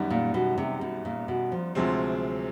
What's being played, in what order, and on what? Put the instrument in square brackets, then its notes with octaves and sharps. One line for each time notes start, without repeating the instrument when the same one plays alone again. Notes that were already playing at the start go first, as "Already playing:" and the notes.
Already playing: [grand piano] F#2 D#3 G3 B3
[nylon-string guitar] A#2
B2
C3
B2
A#2
B2
F3
[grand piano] D2 C3 F3 G#3 C4 [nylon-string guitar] F#3